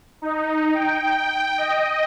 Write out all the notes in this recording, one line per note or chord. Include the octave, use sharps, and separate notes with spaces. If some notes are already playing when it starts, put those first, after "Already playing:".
D#4
G5
D#5